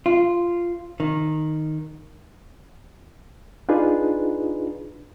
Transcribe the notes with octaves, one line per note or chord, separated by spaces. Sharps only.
F4
D#3
D4 D#4 F4 G#4 B4